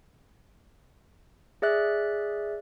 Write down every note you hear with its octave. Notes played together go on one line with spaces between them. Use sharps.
G#4 D5 E5 F#6